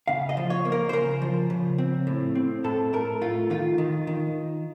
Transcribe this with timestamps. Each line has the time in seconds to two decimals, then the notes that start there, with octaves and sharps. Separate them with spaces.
0.08 C#3 F5
0.29 D#5
0.37 F3
0.50 C#5
0.65 A#3
0.72 A#4
0.89 C5
0.93 C#3 A#4
1.22 F3
1.50 C#3
1.78 C4
2.07 A2
2.35 C4
2.64 A2 A4
2.93 A3 A#4
3.21 A3 F4
3.50 D#3 F4
3.78 D#3
4.07 D#3